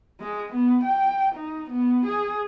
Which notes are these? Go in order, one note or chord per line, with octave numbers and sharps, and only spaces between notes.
G#3
B3
G5
D#4
B3
G#4